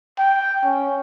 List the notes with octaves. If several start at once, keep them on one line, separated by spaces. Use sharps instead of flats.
G5
C#4